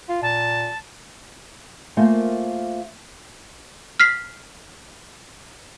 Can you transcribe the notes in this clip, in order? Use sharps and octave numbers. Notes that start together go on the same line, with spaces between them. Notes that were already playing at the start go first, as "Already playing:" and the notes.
F4
A#2 A5
A3 A#3 F4 A#4 C5 G#5
F6 B6 C7